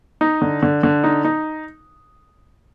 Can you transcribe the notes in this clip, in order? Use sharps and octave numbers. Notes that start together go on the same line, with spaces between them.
D#4
D3
D3
D3
D#4
D#4